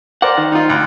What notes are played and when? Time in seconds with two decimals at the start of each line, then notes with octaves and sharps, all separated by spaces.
0.22 A#4 C5 D5 F#5
0.38 D#3
0.52 D#4 F4
0.70 D2